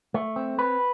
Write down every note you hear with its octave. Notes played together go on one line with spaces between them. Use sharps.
A3
C4
B4